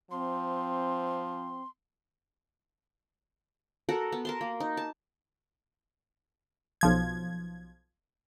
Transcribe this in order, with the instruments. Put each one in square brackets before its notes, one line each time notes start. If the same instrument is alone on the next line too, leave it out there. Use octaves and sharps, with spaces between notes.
[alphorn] F3 [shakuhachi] C4 [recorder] C6
[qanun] F#4 A4 A#4 F#5
B3
A#4 A5 C6
A#3
D#4
A5
[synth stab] B1 F3 G#6